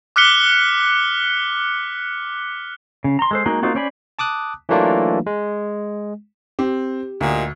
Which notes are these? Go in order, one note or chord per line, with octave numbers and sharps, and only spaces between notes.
D6 F6 F#6 B6 C#7 G7
C#3
A#5 C6
G#3 A4 C5
G#3 A#3 D#4 F#4
A#3 C4 D#4 F4 F#4
C#4 C5 D5 G#5 B5
A5 D6 D#6 F#6
E3 F#3 A3 A#3 D4 F4
G#3
C4 G4
D2 A#2 D#4